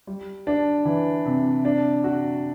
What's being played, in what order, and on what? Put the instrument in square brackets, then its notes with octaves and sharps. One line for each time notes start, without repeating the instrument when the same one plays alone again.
[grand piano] G3
D4
E3
C3
D4
F#4